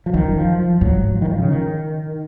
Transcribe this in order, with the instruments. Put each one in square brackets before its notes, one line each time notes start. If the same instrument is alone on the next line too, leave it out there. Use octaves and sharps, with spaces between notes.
[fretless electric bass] F3
[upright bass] F#2 [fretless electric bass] D#3
[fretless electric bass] F3
F3
[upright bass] G#2 [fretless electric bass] F#3
[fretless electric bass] F3
D#3
F3
C#3
D#3